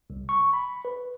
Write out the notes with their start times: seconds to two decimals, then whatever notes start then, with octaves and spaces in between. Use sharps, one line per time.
0.10 C2
0.29 C#6
0.53 B5
0.85 B4